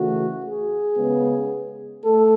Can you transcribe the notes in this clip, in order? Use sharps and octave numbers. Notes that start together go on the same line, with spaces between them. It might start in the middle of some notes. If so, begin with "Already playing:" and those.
Already playing: C#3 E3 A3 F#4
G#4
C#3 G#3 B3
A3 A4